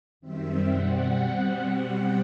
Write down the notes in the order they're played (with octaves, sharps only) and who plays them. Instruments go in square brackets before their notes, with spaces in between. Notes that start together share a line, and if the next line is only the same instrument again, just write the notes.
[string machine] F#2 D#3 G3 C4 E5
B2 G3 C4 F#5